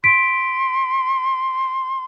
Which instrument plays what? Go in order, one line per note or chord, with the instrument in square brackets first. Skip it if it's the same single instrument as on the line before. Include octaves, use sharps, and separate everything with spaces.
[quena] C6 [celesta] B6 D7